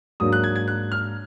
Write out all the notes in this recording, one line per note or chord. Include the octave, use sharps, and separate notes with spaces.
G#2 F#3 A#3 D4 D#6
F#6
G#6
G#6
F#6
F6